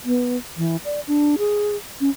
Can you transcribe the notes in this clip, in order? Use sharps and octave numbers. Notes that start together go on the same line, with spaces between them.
B3
E3
D5
D4
G#4
C#4